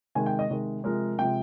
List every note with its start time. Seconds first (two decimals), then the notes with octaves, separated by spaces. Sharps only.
0.15 C3 D#3 G#3 G#5
0.26 G5
0.39 D#5
0.50 C3 D#3 G#3
0.84 C3 F3 G#3 A#4
1.19 C3 F3 G#3 G5